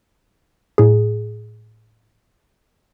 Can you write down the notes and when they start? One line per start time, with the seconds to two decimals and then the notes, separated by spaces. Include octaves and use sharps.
0.78 A2 G#4